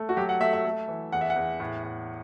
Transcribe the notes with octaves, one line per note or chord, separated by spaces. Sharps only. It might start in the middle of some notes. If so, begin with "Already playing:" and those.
Already playing: A3
F#4
F#3 G4
F#5
A3 E5
E5
A3
E3
E2 F#5
E5
F#5
E2
A2
A2